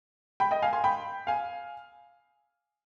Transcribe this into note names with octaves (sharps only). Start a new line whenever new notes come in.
G5 B5
D#5 G5
F5 G#5
G#5 C6
G5 B5
F5 G#5